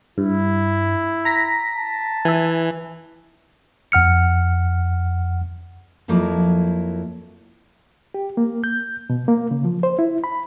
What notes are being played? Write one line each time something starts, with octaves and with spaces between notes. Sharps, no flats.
G2 E4
A#5 A#6 B6
A5
E3 E5 G#5
F2 F#5 F6 C#7
F2 F3 F#3 A#3 E4
G4
A#3
G6
B2
A#3
C#3
F3
C5
E4
B5